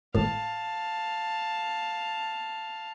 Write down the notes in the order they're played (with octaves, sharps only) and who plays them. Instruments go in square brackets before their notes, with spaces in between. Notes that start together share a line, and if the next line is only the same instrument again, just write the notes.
[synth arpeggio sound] G#1 A2 [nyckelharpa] F5 A5